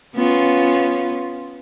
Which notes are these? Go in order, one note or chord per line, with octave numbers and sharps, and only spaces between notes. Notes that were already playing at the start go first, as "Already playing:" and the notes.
B3 C#4 F4